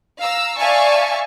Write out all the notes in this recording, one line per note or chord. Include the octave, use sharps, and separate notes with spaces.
F5 A#5 E6
D5 E5 F5 G#5 A5 C#6